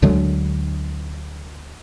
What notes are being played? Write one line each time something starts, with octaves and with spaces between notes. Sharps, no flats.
D2 D3 F#3 G#3